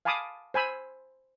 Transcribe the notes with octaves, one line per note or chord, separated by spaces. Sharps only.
F5 G#5 A5 B5 D6 D#6
C5 G#5 B5 E6